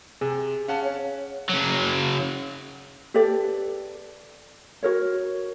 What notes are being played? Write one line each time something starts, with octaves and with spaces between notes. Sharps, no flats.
C3 G#4
C#4 F5 F#5 A5
C#5
C#3 F#3
G4 A4 B4 D5
F#4 A#4 C#5